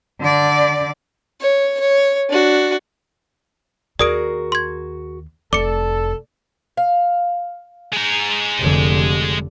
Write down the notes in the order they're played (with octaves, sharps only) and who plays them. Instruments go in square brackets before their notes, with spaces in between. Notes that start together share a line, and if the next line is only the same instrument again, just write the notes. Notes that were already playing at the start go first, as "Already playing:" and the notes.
[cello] D3 D5
[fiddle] C#5
C#5
D4 F#4
[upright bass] D#2 [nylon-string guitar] F#4 G#4 A#4 [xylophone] D5 D#6 D7
[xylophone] C6 G#6
[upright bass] F1 [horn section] A4 [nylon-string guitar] D5 [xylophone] D6 C#7
[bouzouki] F5
[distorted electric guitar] G#3 A#5
[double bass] F1 D3 [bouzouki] G4